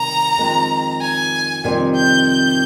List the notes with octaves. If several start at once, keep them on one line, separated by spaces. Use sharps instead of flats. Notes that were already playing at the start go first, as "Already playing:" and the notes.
Already playing: C3 D#3 G3 A#5
F2 D#3 G#3 C4
G#5
F2 C3 D#3 G3 C4
G6
G6